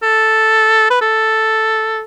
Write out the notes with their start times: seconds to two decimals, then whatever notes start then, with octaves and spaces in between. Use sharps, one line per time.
0.02 A4
0.90 B4
1.01 A4